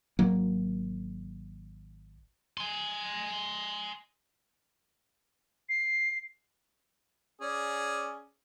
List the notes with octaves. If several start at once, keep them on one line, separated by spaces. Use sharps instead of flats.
G#1 F#3 A#3
G#5 C6
C7
C#4 G#4 D5